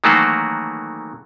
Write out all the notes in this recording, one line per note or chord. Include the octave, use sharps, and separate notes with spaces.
D#3 E3 F#3 A3 A#3 F#4